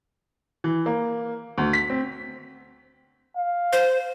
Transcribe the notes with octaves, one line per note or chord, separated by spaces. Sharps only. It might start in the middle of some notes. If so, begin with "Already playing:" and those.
E3
A#3
D2
B6
C4
F5
C5